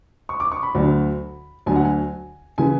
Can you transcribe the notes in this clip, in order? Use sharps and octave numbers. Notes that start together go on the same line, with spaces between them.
C#6
D6
C#6
B5
D2 D3 F#3
D2 D3 F#3 G#5
F#5
G#5
C#3 E3 G#5